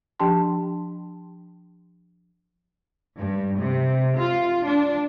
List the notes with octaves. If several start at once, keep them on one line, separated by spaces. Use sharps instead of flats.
F3 D4 G4 G5 A5 C6
G2
C3
F4
D4